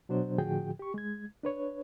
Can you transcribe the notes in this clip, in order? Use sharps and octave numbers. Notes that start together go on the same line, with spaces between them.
B2 F#3 D4 C5
A2 D3 F3 F#4 G#4 G5
G4 C#6
G#3 G#6
D4 B4 C#5